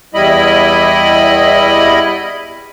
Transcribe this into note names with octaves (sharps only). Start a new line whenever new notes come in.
E2 G3 E4 D#5 B5